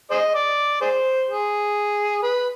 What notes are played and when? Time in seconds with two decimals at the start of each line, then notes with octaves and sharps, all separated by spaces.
0.11 G#4 C5 D#5
0.35 D5
0.81 G#4 C5
1.28 G#4
2.23 B4